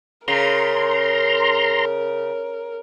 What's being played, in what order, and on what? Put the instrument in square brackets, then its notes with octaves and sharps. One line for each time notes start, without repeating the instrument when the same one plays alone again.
[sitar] C#3 [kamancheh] A#4 [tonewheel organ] A#5 C6